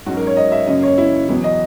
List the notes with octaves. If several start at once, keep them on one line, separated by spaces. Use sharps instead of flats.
G#2 F#3 C#4 F#4
A#4
C#5
D#5
E5
F#2 C#3 F#3 A#3 C#4 D#5
C#5
E4
E2 B2 F#3 B3 E4
D#5